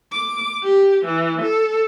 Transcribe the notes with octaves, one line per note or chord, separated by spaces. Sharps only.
D6
G4
E3
A4